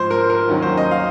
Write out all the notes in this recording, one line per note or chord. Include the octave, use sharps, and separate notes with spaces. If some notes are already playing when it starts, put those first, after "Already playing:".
Already playing: G#2 F3 C5
A#4
A#4
D#2 D#3 F#3 C#4
C5
D#5
F5